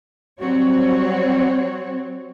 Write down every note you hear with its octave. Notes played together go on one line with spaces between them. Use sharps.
F#3 G3 C4 F#4 C#5